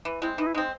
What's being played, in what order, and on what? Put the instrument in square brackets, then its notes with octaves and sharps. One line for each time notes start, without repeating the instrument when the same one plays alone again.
[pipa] E3
[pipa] G#3 C4 [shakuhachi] E4
[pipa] E3 [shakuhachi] D#4
[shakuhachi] E4
[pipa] G#3 [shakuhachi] D#4
[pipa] C4